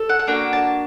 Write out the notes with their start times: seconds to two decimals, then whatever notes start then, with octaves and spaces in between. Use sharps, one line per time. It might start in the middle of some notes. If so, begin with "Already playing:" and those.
Already playing: A4
0.09 F#5
0.19 F#5
0.27 A#3 D4 F#4 G5
0.53 A5